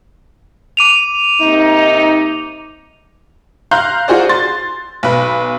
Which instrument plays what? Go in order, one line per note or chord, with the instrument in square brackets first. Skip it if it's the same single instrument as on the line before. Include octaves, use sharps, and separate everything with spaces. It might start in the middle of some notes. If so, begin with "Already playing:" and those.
[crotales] D6 D#7 F7
[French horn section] C3 A#3 D#4
[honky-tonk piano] F5 A#5 C6 F#6 G6
F4 F#4 G#4 C5 D5
C6 A6
B1 B4